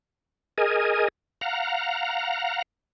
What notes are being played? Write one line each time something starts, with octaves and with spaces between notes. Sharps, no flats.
G#4 A#4 D#5 G#5
F5 F#5 A#5